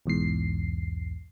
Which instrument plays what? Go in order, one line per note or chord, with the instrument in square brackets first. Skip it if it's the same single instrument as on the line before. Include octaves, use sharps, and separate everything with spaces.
[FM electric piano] B1 E2 G#2 C7